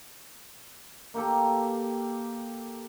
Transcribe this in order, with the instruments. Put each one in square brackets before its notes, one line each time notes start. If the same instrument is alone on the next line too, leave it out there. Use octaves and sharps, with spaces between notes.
[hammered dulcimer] A#3 G4 A4